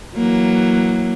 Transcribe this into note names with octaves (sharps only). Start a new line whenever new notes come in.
E3 F#3 A#3